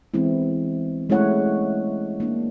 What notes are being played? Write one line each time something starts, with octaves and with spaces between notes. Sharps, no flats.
E3 G#3 B3 C4 E4
G#3 A3 C#4 E4 C#5 F#5
A#3 D4